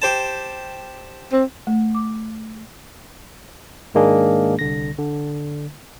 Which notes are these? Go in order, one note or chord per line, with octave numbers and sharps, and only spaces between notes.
G4 C5 A5
C4
A3
D6
G#2 D#3 G#3 A#3 D4 G#4
C2 D3 A#6
D3